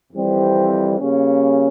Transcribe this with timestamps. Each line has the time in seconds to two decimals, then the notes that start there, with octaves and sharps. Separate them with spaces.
0.13 F2 E3 G3 C4 G4
0.99 C#3 G3 A#3 C#4